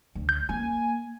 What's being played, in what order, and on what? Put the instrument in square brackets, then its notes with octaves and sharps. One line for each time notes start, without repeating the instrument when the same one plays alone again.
[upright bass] D2
[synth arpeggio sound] G6
[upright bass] A#3 [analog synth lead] G#5